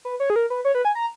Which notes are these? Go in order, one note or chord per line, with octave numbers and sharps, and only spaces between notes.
B4
C#5
G#4
A#4
B4
C#5
B4
G#5
A#5